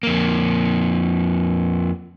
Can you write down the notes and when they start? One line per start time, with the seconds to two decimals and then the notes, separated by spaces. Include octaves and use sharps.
0.03 F2 A#3